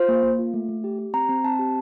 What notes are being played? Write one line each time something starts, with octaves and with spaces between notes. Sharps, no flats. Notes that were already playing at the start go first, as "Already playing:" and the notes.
Already playing: F4 C5
A#3
A#3
F4
A3
A3
G4
G4
C4 A#5
C4
C4 A5
G4